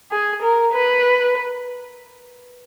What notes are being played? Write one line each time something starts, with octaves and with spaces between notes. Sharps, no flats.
G#4
A#4
B4